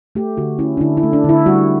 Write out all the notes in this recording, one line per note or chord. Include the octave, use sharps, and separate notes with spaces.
A3 G4
D3 F#4
C#4 E4
D4
D3 E4
E4
A3
D4
D3 E4
G3 F#4